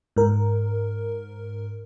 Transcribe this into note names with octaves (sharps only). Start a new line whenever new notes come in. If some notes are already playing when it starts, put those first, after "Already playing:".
G#2 A#4